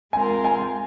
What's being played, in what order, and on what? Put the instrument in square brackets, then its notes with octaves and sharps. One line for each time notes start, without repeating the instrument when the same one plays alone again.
[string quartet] G#3 C4 F4 A#4 [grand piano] G#5
[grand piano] G#5